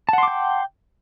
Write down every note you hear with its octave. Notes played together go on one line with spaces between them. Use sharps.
F#5 G5 A5 C6 D6